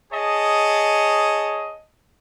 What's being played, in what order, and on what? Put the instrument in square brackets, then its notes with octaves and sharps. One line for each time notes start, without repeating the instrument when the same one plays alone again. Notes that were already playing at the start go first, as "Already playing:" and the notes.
[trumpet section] G#4 C#5 D#5 A5